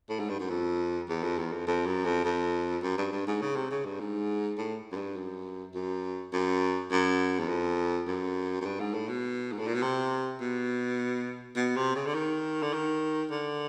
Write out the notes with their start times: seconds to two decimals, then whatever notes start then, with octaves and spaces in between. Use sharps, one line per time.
0.09 A2
0.19 G#2
0.29 G2
0.39 F#2
0.50 F2
1.09 E2
1.23 F2
1.38 E2
1.52 F2
1.67 F2
1.86 F#2
2.05 F2
2.25 F2
2.83 F#2
2.98 G2
3.12 G2
3.27 G#2
3.41 C#3
3.56 C3
3.70 C#3
3.85 G2
4.00 G#2
4.57 A2
4.92 F#2
4.96 G2
5.16 F#2
5.74 F#2
6.33 F#2
6.91 F#2
7.39 E2
7.48 F2
8.07 F#2
8.61 F#2
8.65 G2
8.80 G#2
8.94 A2
9.09 B2
9.52 G#2
9.59 A2
9.67 A#2
9.74 B2
9.82 C3
10.41 B2
11.56 B2
11.76 C3
11.95 C#3
12.06 D3
12.15 D#3
12.62 D3
12.73 D#3
13.31 D3